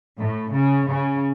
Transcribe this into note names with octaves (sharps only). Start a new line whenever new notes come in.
A2
C#3
C#3